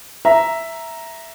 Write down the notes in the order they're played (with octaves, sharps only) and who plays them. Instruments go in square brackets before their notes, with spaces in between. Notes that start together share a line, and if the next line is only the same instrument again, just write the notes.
[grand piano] E5 A#5